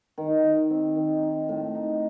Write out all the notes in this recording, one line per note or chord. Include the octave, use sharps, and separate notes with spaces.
D#3
D#3
C4
D#3
D#4
A2
D#4